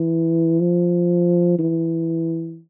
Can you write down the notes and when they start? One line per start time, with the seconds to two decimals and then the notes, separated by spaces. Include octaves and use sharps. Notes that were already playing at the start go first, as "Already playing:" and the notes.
Already playing: E3
0.60 F3
1.59 E3